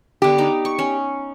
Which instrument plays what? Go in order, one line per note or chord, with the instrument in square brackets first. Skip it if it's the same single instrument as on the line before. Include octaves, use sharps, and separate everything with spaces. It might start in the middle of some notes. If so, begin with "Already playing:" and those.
[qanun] D3 B3 [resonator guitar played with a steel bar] G4
[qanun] D#4 D6
C#6
C#4